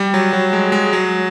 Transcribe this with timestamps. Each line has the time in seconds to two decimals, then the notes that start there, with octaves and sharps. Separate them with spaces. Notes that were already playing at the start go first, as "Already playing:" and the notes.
Already playing: G3
0.14 F#3
0.33 F#3
0.53 G#3
0.72 G#3
0.93 F#3